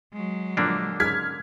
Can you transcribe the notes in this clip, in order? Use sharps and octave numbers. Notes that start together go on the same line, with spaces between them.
F#3 G#3
A#2 D3 F3 A#3 D4
G#2 C#3 F6 G#6 B6